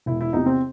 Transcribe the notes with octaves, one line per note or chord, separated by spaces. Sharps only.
E1 E4
E4
E2 C3 D#4
C4